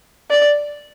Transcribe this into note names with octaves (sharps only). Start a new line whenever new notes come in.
D5